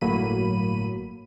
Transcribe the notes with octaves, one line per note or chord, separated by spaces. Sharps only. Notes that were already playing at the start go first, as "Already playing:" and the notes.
G1 A2 F#3 A#3 B5 D#7